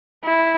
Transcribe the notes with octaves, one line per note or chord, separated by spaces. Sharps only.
E4